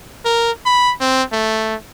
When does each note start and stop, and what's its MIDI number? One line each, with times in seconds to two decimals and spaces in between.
0.25 0.51 70
0.66 0.93 83
1.01 1.23 60
1.32 1.75 57